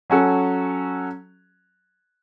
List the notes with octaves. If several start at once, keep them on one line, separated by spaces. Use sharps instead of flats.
F#3 C#4 F#4 A4